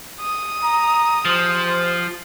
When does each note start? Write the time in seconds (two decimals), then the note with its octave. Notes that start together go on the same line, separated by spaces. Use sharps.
0.20 D#6
0.62 A#5
1.25 F3 G4 G#4 C5